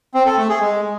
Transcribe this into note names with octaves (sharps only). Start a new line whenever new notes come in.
C4
A4
A3
G#4
G#3